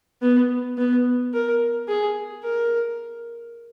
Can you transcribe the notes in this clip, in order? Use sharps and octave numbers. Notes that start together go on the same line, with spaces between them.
B3
B3
A#4
G#4
A#4